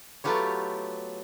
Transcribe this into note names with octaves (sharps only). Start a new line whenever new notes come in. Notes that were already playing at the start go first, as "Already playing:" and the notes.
F#3 A3 B3 F4 G4 C#5